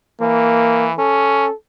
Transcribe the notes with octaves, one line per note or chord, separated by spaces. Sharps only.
E3 A#3
C#4 A4